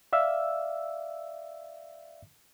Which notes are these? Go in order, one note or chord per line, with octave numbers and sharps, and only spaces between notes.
D5 E5 F5 E6